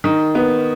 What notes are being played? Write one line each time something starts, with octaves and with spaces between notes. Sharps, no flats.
D#3
B3